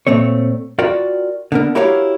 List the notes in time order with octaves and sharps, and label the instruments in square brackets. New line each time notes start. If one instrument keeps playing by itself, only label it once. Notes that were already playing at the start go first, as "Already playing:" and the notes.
[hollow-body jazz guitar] A#2 A3 C4 C#5
F4 F#4 A#4 D5 G5
D3 B3 A#4
E4 F#4 G4 A#4 C#5 F5